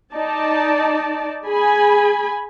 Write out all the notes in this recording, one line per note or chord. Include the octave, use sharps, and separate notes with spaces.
D#4 D5 A5
G#4 G#5 B5